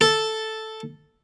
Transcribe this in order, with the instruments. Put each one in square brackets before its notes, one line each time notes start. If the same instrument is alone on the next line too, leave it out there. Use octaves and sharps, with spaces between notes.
[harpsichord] A4